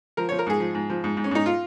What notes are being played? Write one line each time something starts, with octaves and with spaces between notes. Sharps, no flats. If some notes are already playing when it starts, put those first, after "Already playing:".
F3 A#4
C#5
F3
A#4
G#2 G#4
F3
G#2
F3
G#2
G#2
C#4
G#2 D#4
F4